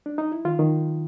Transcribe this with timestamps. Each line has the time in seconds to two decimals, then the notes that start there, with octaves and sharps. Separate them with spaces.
0.06 D4
0.18 D#4
0.32 E4
0.45 D#3 F4
0.59 D#3